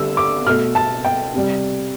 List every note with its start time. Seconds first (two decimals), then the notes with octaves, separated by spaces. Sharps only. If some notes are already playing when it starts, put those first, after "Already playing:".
Already playing: D3 G3 E6
0.17 D6
0.46 B2 A3 F6
0.75 A5
1.04 G5
1.34 C3 G3